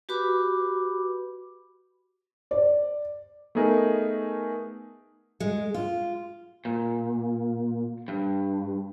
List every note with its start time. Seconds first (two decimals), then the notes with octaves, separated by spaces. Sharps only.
0.09 F#4 G4 B4 B5 D6
2.51 D5
3.55 A3 B3 D#4 G#4 A#4
5.40 G#3
5.74 F4
6.65 A#2
8.08 G2